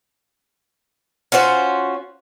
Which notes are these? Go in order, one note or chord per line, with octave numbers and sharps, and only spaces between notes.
C#4 F4 F#4 C5